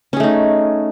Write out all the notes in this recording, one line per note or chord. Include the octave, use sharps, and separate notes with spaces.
A3 C#4 D#4 G#4